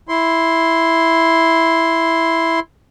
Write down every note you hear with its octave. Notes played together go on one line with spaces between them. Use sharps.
E4 C6